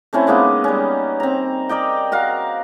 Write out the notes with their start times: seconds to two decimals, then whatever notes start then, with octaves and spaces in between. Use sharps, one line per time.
0.13 A3 C4 C#4 E4
0.27 G#3 A#3 B3 D#4
0.64 G3 C#4
1.20 C4 A#5
1.69 A#4 D5 D#5 G5
2.12 F#4 A#4 F5